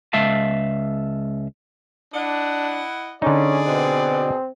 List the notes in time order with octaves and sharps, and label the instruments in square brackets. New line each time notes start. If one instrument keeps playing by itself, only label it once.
[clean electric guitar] C#2 G#3 E5 F5 A5
[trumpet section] D4 [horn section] E4 D#5 F#5
[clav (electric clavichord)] D3 D#4 [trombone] C#4 [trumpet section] G#4 D5
[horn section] B2 [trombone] C4